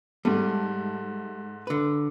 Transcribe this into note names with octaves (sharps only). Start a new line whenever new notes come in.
G#2 G3 A3
D3 B4